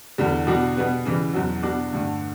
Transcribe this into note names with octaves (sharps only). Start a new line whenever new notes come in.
E2 D3 G3
B2 G3 D4 F#4
B2 G3 B3
C#3 E3 G3
E2 B2 F#3
B2 G3 D4 F#4
G2 D3 A3